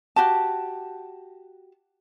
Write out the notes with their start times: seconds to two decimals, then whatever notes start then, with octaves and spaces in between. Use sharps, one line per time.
0.16 F#4 G4 A5